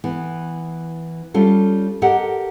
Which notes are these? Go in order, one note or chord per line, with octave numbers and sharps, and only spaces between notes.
E3 B3
G3 C#4 F4 A4
G4 A4 A#4 D#5 F#5